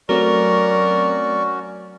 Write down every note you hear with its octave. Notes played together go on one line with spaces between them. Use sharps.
F#3 A3 C4 C#4 F#4 A#4 D5 C#6